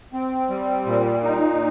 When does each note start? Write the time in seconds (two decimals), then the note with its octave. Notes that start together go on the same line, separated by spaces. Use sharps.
0.13 C4
0.49 G3
0.86 A#2
1.23 D#4